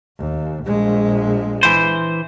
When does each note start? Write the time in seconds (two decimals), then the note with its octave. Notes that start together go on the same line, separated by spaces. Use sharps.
0.18 D#2
0.65 A#1 G#3
1.63 E3 C5